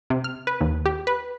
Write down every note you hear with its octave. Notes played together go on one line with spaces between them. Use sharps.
C3
F6
B4
D#2
G4
B4